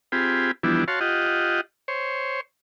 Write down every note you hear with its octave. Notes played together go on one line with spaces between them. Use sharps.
C4 F4 G4 G#4 B5
E3 F3 G3 B3 D4 E4
F#4 C#5 F5 A5 C6
F4 G4 D#5 F#5
C5 C#5